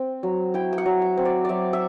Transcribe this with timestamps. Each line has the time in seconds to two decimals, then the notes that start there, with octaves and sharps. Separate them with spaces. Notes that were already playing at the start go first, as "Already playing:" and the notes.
Already playing: C4
0.23 F#3
0.54 E4 G5
0.73 G5
0.78 F#5
0.86 F#3
1.02 E5
1.17 C4
1.25 D5
1.45 F#3 D5 E5
1.73 E5